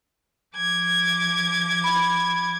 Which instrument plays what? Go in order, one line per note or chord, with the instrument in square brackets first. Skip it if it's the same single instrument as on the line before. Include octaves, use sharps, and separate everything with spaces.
[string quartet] F3 D6 G#6
[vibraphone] B5